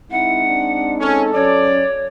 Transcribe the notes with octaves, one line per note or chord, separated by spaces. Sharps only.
G#3 C4 D#4 E4 F#5
D4
C#4 A4
F#2 F#3 C#4 C#5 D5